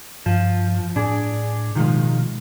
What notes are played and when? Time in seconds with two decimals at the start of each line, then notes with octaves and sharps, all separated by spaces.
0.26 G2 F3
0.96 A2 D4 G#4
1.75 B2 D#3 F3 G#3